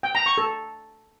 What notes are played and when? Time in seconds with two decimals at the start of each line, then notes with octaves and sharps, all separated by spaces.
0.03 G5
0.15 A#5
0.26 C#6
0.38 A4